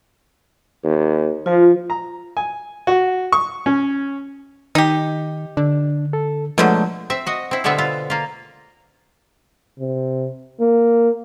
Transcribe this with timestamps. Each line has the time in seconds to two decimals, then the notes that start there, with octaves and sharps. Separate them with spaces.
0.84 D#2
1.46 F3 F4
1.90 A#5
2.37 G#5
2.87 F#4
3.32 C#6
3.66 C#4
4.75 D#3 D#4 G4
5.57 D3 D4
6.13 A4
6.58 B2 D3 F3 F#3 G#3 A3 G6
7.10 C4 E5
7.26 F#4 D#5
7.51 C4 E4
7.64 B2 D3 G3 B3 C4 E5
7.78 F4
8.10 A#3 F4
9.79 C3
10.60 A#3